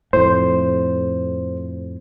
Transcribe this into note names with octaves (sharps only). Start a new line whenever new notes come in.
F2 A2 C5